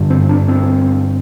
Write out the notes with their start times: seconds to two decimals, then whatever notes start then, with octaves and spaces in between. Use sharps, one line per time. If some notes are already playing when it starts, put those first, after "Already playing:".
Already playing: G2 D3
0.10 C4
0.29 D4
0.48 C4